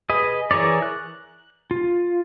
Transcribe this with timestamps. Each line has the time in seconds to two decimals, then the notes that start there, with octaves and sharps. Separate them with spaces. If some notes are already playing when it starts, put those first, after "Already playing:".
0.10 G#4 B4 D#5
0.51 E3 G#4 A#4 C#5 D5
0.82 F#6
1.71 F4